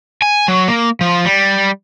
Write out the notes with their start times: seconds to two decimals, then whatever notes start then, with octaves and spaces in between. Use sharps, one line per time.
0.22 G#5
0.48 F#3
0.68 A#3
1.01 F3
1.25 G3